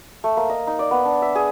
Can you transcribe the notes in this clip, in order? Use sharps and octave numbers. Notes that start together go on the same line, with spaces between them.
A3
A#3
D#5
D#4
D5
B3
D4
E5
G#4